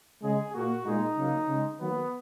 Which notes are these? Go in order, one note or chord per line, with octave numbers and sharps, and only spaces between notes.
C#3 G#3 G#4
A#2 A#3 F#4
A#2 G#3 D#4
C#3 F#3 A#3
C#3 G#3
D#3 F#3 A#3 B3